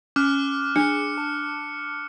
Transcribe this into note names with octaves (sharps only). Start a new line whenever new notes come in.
C#4 D6 F6 F#6
D4 G#4 C#7
A5